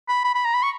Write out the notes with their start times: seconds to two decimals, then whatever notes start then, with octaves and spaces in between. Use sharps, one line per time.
0.09 B5
0.24 B5
0.35 B5
0.45 A#5
0.55 B5
0.63 C#6